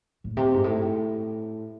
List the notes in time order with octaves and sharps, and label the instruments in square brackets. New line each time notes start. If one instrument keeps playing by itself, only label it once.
[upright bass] A2
C3
G#2
A2